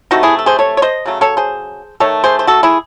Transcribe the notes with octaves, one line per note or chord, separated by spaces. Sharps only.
C3 E3 A3 D#4 F#4
E4 G#4
A4
G#4 C5
A4 C#5
C#5
C5 D#5
C#3 F#3 A3
A4 C#5
G#4 C5
D#3 A3 A4 C#5
G#4 C5
C5
F#4 A4
E4 G#4